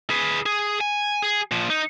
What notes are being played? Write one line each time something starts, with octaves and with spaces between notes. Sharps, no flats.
G#4 B4
G#4
G#5
G#4
A#2 F3
D#4